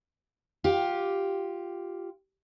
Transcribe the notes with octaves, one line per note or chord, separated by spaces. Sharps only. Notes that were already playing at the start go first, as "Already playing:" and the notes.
F4 G4